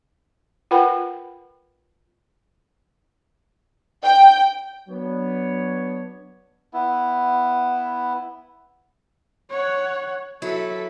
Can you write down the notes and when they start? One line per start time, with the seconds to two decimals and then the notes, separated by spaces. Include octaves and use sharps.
0.71 F4 A#4 B4 F#5 G5 B5
4.04 G5
4.88 F#3 B3 D4 C#5
6.74 B3 E4
9.50 C#5 F#5
10.42 F#3 E4 A4 B4 E5